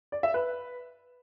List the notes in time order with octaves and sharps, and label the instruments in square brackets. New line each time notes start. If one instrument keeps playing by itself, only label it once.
[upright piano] D5
E5
B4